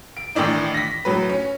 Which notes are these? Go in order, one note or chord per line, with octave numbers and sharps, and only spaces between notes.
D7
A2 D#3 E3 D4 D#4
A#6 B6
A2 F#3 B4
C#4